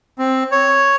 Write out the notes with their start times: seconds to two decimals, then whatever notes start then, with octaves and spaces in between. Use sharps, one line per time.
0.18 C4
0.51 C#5